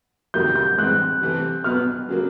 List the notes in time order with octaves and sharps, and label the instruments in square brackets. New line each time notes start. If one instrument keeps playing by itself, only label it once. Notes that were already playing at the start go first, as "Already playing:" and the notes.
[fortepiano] F2 C3 D#3 F#3 A#3 [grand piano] G6
[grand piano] G6
[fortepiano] A2 E3 G#3 C4 [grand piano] F#6
[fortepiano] C3 E3 A3 C4
[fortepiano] B2 F#3 B3 [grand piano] F6
[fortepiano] C#3 F#3 A#3